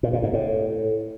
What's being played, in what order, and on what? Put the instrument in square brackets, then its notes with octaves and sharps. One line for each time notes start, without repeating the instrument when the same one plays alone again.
[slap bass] A#2
A#2
G#2
A2